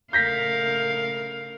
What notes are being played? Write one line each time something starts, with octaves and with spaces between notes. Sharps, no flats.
C#3 A3 A#4 F5 G6 A#6 B6